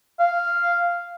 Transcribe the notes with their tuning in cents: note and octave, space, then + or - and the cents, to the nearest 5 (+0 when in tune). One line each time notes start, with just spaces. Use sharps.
F5 -5